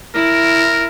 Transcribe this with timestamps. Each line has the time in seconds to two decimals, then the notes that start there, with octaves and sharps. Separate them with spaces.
0.15 E4 A#4